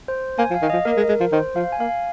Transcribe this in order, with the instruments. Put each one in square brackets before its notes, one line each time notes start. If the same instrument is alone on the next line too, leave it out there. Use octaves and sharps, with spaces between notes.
[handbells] C5
[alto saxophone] A#3 [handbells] G#5
[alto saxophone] F3
[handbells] F5
[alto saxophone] D#3
[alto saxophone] F3 [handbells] D#5
[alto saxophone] A#3 [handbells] A#4
[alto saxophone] G#3
G#3
F3
[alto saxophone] D#3 [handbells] C5
[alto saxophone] F3 [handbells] F5
[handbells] G#5
[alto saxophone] A#3 [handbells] F5